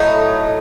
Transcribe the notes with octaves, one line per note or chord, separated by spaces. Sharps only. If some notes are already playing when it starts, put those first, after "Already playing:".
Already playing: A2 F#3 A3 D#4